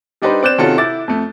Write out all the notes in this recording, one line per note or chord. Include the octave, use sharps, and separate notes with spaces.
G3 D4 D#4 G4 B4 C5
C4 D5 F#6 G6 E7
C3 D#3 C#4 F4 F#4 A4
E4 D6 A6
F2 A3